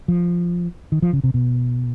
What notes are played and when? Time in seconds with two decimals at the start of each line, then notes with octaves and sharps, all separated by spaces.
0.08 F3
0.92 D#3
1.02 F3
1.13 C#3
1.24 C3
1.34 B2